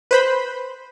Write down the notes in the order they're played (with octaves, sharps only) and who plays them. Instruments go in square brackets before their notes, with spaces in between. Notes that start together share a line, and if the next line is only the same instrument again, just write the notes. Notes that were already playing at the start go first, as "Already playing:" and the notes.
[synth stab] B4 C5 B5